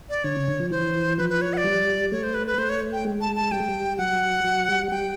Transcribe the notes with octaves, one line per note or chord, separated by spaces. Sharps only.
D5
D3 C#5
C#3
D3
F3
E3 C5
F3 B4
B4
C#5
F#5
D5
G3
A3 C#5
C5
B4
B4
A3 C5
C#5
G5
G#3
A5
A5
G3 G5
G#3
G3
F#3 F#5
F#3
G3
G3 G5